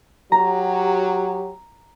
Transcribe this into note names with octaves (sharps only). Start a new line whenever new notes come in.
F#3 G4 A#5